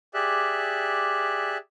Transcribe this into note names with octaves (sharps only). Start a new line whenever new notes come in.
G4 G#4 D5 E5 F#6